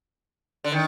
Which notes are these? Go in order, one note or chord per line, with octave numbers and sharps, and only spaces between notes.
D3
D#3